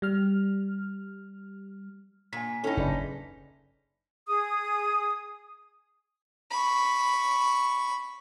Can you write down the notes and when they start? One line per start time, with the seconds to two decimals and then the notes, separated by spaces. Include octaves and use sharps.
0.02 G3 F6
2.33 A#2 G#5 B6
2.64 A2 C#4 D#4
2.77 F#1 E3 G#3 D4
4.27 G#4 D#6
6.51 B5 C#6